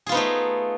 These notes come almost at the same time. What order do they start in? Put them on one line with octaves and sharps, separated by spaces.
G#4 F4 B3 D#4 A3